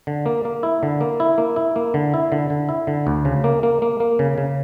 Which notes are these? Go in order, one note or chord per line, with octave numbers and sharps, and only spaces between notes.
D3
A#3
A#3
E4
D3
A#3
E4
A#3
E4
A#3
D3
E4
D3
D3
E4
D3
D2
C#3
A#3
A#3
A#3
A#3
C#3
C#3